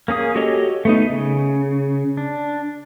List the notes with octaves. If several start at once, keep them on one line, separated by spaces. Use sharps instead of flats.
A#3 C#4 G#4 D#6
F#4 G4 A4 C#5 D#5
A3 B3 D#4
C#3
D4